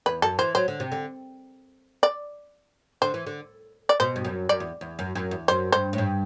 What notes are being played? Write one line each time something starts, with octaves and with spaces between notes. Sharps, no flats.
E2 B4
F#2 A4
E3 C5
F#3 C5
D3
C3
D3
D5
D3 C5
E3
D3
D5
B2 C5
G2
F#2
F#2 D5
E2
E2
F#2
F#2
E2
F#2 C5
G2 C5
A2
G2